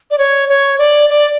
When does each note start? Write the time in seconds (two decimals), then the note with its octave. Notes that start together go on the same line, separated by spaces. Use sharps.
0.11 D5
0.18 C#5
0.49 C#5
0.78 D5
1.09 D5